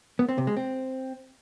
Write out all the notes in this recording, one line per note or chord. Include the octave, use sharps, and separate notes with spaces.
B3
C4
C3
G#3
C4